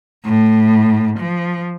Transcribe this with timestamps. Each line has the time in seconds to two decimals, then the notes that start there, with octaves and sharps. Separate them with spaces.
0.25 A2
1.20 F3